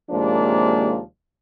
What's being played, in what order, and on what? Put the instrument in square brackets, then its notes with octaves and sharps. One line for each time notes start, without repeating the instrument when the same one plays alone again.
[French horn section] D#2 C3 F3 G#3 A#3 D4